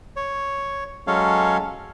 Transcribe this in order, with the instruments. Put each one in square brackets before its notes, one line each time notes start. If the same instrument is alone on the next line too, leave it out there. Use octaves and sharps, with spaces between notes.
[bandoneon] C#5
F#3 G#3 C#4 A4 C#5 F5